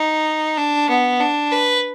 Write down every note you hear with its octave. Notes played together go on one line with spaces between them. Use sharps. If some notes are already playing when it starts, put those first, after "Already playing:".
Already playing: D#4
D4
B3
D4
B4